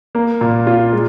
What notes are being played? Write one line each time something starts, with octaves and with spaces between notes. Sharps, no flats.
A#3
A#2
F4
G#3